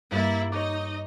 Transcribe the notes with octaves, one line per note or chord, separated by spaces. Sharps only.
G2 A#3 E4 A6
D#4 C#5 D#5 D6